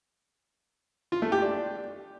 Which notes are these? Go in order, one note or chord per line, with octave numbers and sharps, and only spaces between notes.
F4
A3
G4
D4